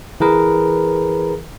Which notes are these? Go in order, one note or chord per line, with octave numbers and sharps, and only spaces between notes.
E3 G#4 A#4 B4